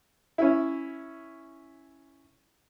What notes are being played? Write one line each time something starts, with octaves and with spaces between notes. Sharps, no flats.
C#4 E4